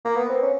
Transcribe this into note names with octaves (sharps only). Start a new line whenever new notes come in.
A#3
B3
C4
C#4